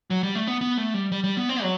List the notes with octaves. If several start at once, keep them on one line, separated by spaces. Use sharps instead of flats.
F#3
G3
A3
B3
B3
A3
G3
G3
G3
B3
C4
F#3